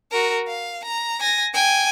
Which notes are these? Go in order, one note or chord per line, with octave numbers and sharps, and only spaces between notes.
F#4 A#4
F5
A#5
G#5 A#6
G5 G#5